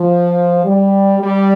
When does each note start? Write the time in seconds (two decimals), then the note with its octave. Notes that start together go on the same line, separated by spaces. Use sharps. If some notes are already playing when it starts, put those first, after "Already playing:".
Already playing: F3
0.65 G3
1.20 G3